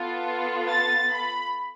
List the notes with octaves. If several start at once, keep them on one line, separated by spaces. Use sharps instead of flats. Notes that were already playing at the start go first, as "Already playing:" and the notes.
Already playing: B3 F4 A4
A6
B5